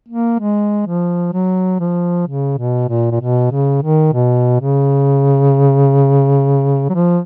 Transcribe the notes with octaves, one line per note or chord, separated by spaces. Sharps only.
A#3
G#3
F3
F#3
F3
C#3
B2
A#2
A#2
B2
C#3
D#3
B2
C#3
F#3
F3